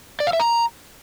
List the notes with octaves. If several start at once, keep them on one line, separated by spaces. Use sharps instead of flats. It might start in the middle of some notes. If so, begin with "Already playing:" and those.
D5
F5
E5
A#5